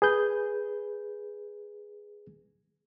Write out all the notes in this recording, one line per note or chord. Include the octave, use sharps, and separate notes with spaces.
G#4 B4 G6